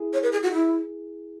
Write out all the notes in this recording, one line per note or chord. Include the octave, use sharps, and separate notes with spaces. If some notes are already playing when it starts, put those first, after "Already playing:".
Already playing: E4 G#4
C#5
B4
G#4
F#4
E4